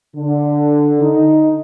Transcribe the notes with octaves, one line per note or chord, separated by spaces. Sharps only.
D3
D#4